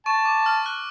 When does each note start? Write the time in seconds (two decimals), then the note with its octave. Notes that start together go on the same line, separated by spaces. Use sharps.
0.06 A5 C#6
0.25 D6
0.46 F6
0.66 F#6